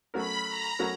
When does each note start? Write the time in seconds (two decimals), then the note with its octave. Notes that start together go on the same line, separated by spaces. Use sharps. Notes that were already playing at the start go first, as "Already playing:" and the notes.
0.14 F#3 A3 C#4 F#4 A#4 B5
0.47 A#5
0.79 F#3 A3 C#4 F#4 A#4